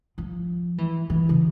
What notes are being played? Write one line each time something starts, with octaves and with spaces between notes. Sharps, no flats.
F3
E3
E3
C#3